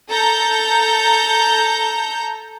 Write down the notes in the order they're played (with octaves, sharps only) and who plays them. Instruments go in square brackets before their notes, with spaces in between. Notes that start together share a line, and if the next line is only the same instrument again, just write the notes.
[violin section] A4 A#5 G6